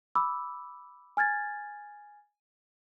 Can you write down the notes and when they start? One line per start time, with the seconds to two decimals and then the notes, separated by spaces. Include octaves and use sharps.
0.15 B5 D6 E6
1.17 G#5 F6 G#6 A6